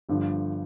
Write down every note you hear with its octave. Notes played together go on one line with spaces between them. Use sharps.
G1 G2 D3 F3